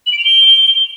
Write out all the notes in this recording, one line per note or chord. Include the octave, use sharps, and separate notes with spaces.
F#7
D7
F7
G7